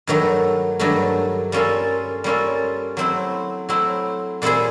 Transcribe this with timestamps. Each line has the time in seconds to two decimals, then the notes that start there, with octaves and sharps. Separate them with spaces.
0.07 G2 D#3 F#3 A3
0.79 G2 D#3 F#3 A3
1.52 G3 A#3 C#4 F4 A4
2.24 G3 A#3 C#4 F4 A4
2.97 F#3 A3 C4 E4
3.69 F#3 A3 C4 E4
4.42 A#2 G3 C4 E4 G#4